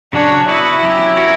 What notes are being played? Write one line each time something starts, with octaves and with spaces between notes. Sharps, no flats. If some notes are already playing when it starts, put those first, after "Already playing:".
C#3 F#3 C#4 D4 F#4 C#5
B3 E4 F#4 B4
F#3 C#4 G4
F#3 C#4 F#4 A#4 C#5